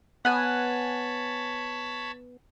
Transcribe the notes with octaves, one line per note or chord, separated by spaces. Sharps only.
B3 C#5 F#5 G#5 A5 B5